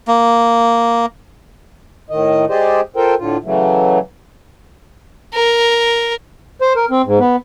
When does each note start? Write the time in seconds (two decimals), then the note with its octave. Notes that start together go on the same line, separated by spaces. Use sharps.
0.08 A#3
2.10 A2 D#3 D#5
2.49 G#3 G4 G#4 C5 D5 D#5
2.96 F4 A4 A#4 C5 G5
3.18 A2 D3 F4
3.44 C#3 E3 F#3 A3
5.34 A#4
6.61 C5
6.76 A#4
6.91 C4
7.05 G#2
7.19 B3